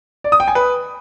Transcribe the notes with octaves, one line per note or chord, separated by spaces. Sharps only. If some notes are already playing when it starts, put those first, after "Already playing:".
D5
D#6
G5
G#5
B4